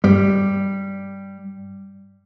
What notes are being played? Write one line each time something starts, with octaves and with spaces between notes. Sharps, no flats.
G2 G3